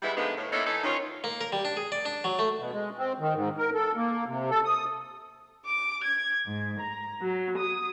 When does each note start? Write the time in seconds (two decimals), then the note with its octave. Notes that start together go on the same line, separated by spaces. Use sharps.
0.03 E3 G3 G#3 B3 E4
0.17 D3 D#3 F3 G#3 A3 B3
0.37 A2
0.52 A#3 B3 C#4 D#4 E4 A4
0.66 E3 D#4 A4
0.84 D#3 C#4 F4
1.24 A#3
1.41 A#4
1.52 G3
1.65 D4
1.77 G#4
1.92 D5
2.05 D4
2.24 F#3
2.39 A3
2.59 B2
2.72 G#3
2.98 C4
3.20 D#3
3.34 G#2
3.58 A#4
3.74 A4
3.96 A#3
4.27 C3
4.50 A4
4.65 D#6
5.65 D6
6.04 G#6
6.45 G#2
6.79 A#5
7.21 F#3
7.58 D#6